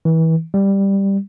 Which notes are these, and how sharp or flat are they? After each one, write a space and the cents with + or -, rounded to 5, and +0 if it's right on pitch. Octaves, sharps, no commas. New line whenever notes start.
E3 -30
G3 +5